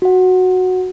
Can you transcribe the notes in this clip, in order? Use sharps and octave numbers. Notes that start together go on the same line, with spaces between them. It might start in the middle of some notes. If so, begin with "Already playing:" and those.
F#4 F#5